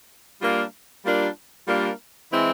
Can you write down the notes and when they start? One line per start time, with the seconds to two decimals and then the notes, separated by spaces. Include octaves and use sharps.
0.42 G3 A#3 D4 F4 A#4
1.05 G3 A#3 D4 F4 A#4
1.68 G3 A#3 D4 F4 A#4
2.32 E3 G#3 C4 E4